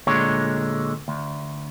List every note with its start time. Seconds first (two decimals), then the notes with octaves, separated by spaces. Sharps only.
0.07 D2 A#2 D3 G#3 C#5
1.08 D2